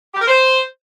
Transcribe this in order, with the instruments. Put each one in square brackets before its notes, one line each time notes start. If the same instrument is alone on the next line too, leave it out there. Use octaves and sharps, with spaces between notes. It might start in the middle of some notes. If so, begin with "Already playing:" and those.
[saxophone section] G4
A#4
C5